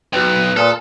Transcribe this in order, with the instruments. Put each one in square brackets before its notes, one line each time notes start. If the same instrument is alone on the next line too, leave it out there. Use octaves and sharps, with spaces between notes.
[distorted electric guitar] B1 [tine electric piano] F#4 G5 [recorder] B4
[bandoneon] A#2 [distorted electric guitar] A4 [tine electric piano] A5 D#6 F6